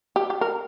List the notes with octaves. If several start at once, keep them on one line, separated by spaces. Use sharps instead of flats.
G4
G4
A#4